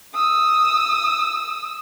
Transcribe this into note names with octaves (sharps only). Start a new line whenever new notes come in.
D#6 E6